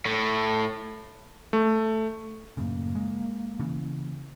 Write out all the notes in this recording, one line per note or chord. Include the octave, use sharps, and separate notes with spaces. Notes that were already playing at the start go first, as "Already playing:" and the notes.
A2
A3
F#2 A2 C#3 A#3
G#3
C#3 E3